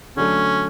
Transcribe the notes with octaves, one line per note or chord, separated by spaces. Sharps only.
D3 F#3 A3 C#4